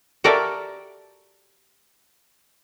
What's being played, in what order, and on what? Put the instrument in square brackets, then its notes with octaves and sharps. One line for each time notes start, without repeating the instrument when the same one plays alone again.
[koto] F#4 G4 A4 A#4 D5 E5